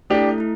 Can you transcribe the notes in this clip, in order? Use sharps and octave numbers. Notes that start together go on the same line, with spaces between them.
A3 D4 E4 G4 A4
A3 E4